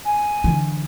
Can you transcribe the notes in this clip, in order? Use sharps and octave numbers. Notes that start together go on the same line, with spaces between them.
G#5
D3 E3